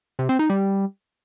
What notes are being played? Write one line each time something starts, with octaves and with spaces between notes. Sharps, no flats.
C3
C4
D#4
G3